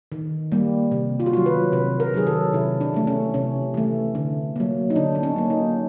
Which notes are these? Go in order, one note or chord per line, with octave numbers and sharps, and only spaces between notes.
D#3
G3 A#3
C3
F4
F#4
D#3 F#3 F4
B4
C3 B4
A#4
D#3 F#3 G#4
A4
C3 E4
D4
E3 A3
C#4
C3 C#4
E3 A3
D3
F#3 A#3
D#4
D3 D4
D4
C#4
F#3 A#3
D#4